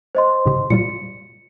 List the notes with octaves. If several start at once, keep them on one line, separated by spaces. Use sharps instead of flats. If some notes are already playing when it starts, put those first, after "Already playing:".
C5 D#5 C6
G#2 C#3 G4
A#2 G3 F4 C#7